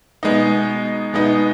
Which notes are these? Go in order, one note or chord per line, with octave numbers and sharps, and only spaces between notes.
B2 G#3 B3 D#4
B2 G#3 B3 D#4